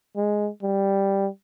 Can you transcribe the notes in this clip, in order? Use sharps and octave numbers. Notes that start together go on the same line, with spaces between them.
G#3
G3